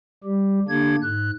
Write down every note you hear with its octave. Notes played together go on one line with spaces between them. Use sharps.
G3 G4
D3 A#3 D4 G4 G#6
G#2 F#6